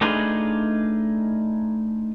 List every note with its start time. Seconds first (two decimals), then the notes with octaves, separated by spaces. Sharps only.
0.01 A3 D4 D#4 F4 G#4 B4